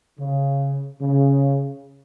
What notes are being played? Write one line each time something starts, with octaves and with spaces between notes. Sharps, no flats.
C#3
C#3